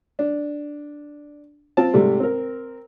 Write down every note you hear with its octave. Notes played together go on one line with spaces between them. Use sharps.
D4
C4 F4 A5
G#2 C3 G3 A3
C4 A#4